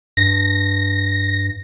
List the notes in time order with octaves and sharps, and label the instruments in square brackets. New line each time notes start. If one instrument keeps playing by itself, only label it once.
[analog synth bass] G2 [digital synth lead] A#6